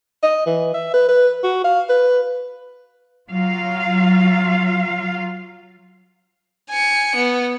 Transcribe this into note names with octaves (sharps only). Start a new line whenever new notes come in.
D#5
E3
E5
B4
B4
F#4
F5
B4
F#3 F4 F5
G#5 C#7
B3